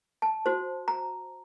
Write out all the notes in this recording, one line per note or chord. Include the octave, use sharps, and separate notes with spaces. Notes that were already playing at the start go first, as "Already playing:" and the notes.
A5
F#4 C5
A#5